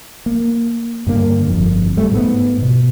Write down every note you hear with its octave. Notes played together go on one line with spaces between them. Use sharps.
A#3
G2 D3 A#3
G1 F2
G3 A3
G#2 A3 B3
B2